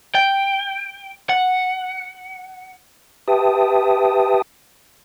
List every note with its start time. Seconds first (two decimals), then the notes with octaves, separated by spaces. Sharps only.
0.15 G5
1.29 F#5
3.28 G4 B4 E5 G5 A5 D#6